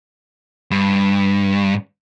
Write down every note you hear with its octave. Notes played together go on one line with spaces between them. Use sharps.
G2